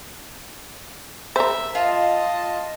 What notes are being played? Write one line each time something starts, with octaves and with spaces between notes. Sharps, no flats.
A#4 C5 E5
F4 D#5 A5